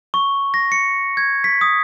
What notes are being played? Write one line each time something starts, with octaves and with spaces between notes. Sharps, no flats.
C#6
A#6
C#7
G#6
B6
D#6